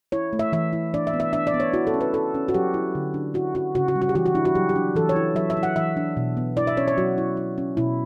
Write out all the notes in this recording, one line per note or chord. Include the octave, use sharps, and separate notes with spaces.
E4 C#5
A3
E5
E3 E5
E4
D4 D5
E5
B3
E5
D4 E5
D5
B3
C#5
E4 F#4
A4
C#4
B4
E4 A4
C#4
F#4
F#3 G4
E4
D3
D4
E4 F#4
C#4 F#4
C#3 F#4
F#4
G3
F#4
G4
E3 F#4
F#4
D4 E4
F#4
F#3 G4
G4
D4
E3 A4
C#5
E4
F#3 E5
E5
E4
F#5
E3 E5
D4
B2
B3
E4 D5
E5
C#4 C#5
C#5
F#3 F#4
E4
E4
C#4
B2 E4